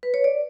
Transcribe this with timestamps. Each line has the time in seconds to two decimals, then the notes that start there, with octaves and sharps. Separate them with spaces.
0.03 B4
0.14 C#5
0.24 D5